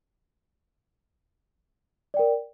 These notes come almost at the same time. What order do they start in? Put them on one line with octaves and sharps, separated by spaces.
D5 G5 A#4